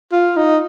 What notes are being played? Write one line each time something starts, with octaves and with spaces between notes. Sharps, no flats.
F4
D#4